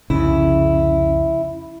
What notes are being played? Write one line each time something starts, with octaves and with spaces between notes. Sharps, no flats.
C2 F2 C#3 E4